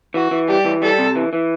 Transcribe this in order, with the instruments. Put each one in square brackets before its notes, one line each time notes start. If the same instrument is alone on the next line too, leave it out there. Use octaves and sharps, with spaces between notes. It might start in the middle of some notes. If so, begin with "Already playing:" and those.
[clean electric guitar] E3 [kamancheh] F#4
[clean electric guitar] E3
[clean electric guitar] G3 [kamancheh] G4
[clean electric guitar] E3
[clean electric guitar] G3 [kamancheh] A4
[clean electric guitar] C3
E3
E3